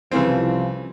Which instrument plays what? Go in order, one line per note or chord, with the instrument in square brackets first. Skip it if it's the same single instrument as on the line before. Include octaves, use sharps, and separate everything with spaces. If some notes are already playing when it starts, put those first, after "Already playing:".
[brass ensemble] C2 F3 [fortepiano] C#3 E3 C4